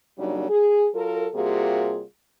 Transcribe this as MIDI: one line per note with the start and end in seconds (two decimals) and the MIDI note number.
0.18 0.47 49
0.18 0.47 54
0.18 0.47 55
0.18 0.47 58
0.18 0.47 62
0.18 0.47 63
0.49 0.88 68
0.94 1.28 54
0.94 1.28 65
0.94 1.28 69
0.94 1.28 70
1.34 2.02 48
1.34 2.02 55
1.34 2.02 58
1.34 2.02 65
1.34 2.02 66
1.34 2.02 68